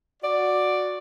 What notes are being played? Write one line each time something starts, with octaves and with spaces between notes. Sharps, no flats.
F#4 D5